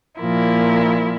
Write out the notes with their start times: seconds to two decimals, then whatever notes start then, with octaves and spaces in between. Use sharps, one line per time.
0.20 A#2 F3 A#3 E4 A#4